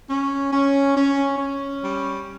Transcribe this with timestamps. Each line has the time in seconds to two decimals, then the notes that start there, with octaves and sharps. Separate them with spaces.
0.09 C#4
0.52 C#4
0.96 C#4
1.38 C#4
1.82 G3